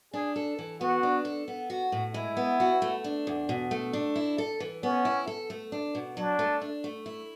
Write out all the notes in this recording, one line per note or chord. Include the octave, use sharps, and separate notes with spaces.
D4 G#4
A4
E3
B3 F#4
D4
A4
B3
F#4
A2
G#3 E4
B3
F#4
A3
D4
E2
B2
A3
D4
E4
A4
E3
B3 C#4
E4
A4
A3
D4
B2
F#3 D4
A3
D4
A3
E4